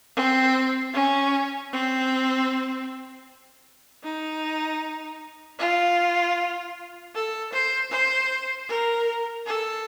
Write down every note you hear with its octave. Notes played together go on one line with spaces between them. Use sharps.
C4
C#4
C4
D#4
F4
A4
C5
C5
A#4
A4